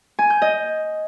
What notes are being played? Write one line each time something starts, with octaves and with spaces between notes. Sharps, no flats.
G#5
G6
D#5